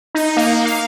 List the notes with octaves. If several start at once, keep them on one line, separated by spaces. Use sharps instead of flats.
D#4
A#3
F5